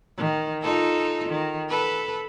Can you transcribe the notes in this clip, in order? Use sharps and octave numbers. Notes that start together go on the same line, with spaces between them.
D#3
D#4 F4 A4
D#3
A4 B4